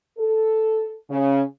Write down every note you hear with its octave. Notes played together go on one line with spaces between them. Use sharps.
A4
C#3